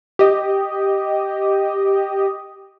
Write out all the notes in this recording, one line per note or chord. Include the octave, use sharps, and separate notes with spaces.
G4 D#5